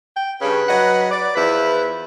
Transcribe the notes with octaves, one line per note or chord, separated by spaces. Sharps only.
G5
G2 C#3 B4
F#3 D#5 F#5
D5
E2 F3 E4 B4